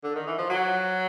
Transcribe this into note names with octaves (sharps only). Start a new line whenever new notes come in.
D3
D#3
E3
F3
F#3